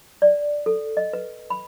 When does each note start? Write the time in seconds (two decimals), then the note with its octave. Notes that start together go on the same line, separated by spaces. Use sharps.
0.22 D5
0.66 A4
0.97 D#5
1.13 B4
1.50 B5